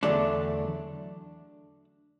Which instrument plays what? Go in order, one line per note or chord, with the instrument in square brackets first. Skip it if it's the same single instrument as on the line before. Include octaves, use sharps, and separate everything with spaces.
[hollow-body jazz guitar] E2 D3 F#3 A3 D4